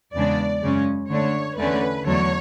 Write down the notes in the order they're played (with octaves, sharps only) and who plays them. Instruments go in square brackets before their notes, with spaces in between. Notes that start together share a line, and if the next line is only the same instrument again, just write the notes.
[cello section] E2 C#3 G#3 B3 D4 D5
F#2 C#3 G#3 C#4
D3 A3 D4 C#5
E2 D3 A3 C#4 B4
E2 D3 F#3 A3 D4 C#5